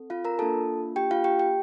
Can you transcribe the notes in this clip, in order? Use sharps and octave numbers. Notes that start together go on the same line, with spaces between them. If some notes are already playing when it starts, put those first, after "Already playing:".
Already playing: C4 A4
F4 F5
A#4 A#5
A#3 D4 F4 A4 A5
G4 G5
F4 F5
G4 G5
G4 G5